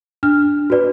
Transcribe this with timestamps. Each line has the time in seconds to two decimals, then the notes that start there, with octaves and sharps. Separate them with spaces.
0.23 D4 F6
0.70 F#4 B4 D5